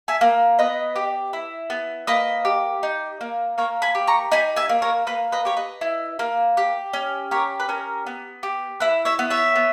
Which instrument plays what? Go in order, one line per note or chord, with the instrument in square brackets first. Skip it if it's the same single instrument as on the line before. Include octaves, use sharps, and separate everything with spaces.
[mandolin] E5 G#5
A#3
B3 B4 D#5
G4
E4
B3
A#3 B4 D#5
G4
D#4
A#3
A#3 A#4 C#5
G#5 B5
G4
A#5 C#6
D#4 G#5 B5
E5 G#5
A#3
A#4 C#5
A#3 B4
B4 D#5
G4 C#5
B4 D#5
E4
A#3
G4
C#4
G4 A#4 C#5
B4
C#4 A#4
B3
G4
E4 B4
C#5 E5
B3
C#5 E5
B3